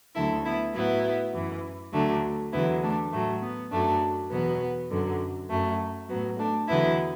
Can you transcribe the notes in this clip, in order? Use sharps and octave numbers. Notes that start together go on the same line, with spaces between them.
D2 D3 F#3 E4 A4
B3 E4
A2 F#3 B3 E4
F#2 E3
D2 D3 F#3 A3 D4
E2 D3 F#3 B3 E4
A3 D4
A2 F#3 A3
B3
F#2 F#3 A3 D4
E2 B2 F#3 B3
F#2 D3 F#3
F#2 F#3 A3
A2 F#3 B3
A3 D4
E2 D3 F#3 B3 E4